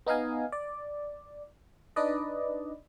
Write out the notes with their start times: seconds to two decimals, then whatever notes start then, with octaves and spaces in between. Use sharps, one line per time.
0.07 B3 D#4 D#5 F5 G#5
0.52 D5
1.96 D4 D#4 B4 D5 D#5